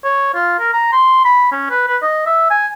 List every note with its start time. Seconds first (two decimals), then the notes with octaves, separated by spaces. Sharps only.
0.04 C#5
0.34 F4
0.59 A#4
0.73 A#5
0.92 C6
1.25 B5
1.52 C#4
1.70 B4
1.88 B4
2.02 D#5
2.26 E5
2.50 G#5